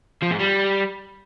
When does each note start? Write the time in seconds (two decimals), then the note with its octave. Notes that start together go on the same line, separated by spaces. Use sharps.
0.23 F3
0.31 G#2
0.40 G3